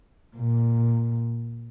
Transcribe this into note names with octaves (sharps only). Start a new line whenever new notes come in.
A#2